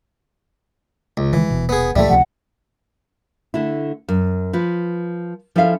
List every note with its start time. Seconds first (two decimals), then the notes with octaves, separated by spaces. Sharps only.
1.17 C#2
1.33 D#3 E3 G#3
1.51 D#1 B2
1.69 B3 G#4
1.96 C#2 A#2 F3 G3 A3 E5
2.09 C#2 C3 F3 F#5
3.54 D3 A3 E4
4.08 F#2
4.53 F3 B4
5.56 F3 C#4 E4 A4 E5 F5